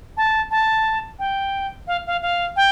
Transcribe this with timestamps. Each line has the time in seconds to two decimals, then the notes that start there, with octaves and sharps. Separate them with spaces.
0.17 A5
0.51 A5
1.19 G5
1.87 F5
2.07 F5
2.22 F5
2.56 G5